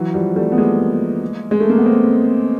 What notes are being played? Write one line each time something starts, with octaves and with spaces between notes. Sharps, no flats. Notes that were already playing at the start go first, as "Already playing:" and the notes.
Already playing: E3 F#3
F3 G3
G3 A3
B3
G#3 A#3
G#3
A3
A#3
B3
A#3 C4